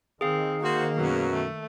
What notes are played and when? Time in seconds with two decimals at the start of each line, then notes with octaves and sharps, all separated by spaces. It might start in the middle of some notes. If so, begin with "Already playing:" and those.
0.21 D#3 C4 G#4 F5
0.63 A#3 F#4 C5
0.97 F#2 B2 F#3
1.32 A3